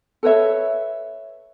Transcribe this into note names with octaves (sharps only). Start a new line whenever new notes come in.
A4 B4 C#5 E5